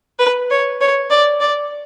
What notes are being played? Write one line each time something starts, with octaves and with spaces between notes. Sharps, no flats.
B4
C#5
C#5
D5
D5